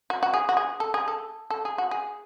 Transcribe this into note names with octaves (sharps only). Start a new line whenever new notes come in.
F#4
F#4
G#4
F#4
G#4
A4
G#4
A4
A4
G#4
F#4
G#4